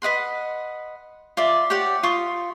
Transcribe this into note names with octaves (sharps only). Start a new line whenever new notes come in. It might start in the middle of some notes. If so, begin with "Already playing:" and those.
B4 D#5 F#5 C6
F4 D5 E5
G4 C#5 D5 F#5
F4 C#6 D#6